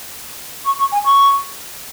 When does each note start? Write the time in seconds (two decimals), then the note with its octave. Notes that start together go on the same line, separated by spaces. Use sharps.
0.64 C#6
0.78 C#6
0.91 G#5
1.04 C#6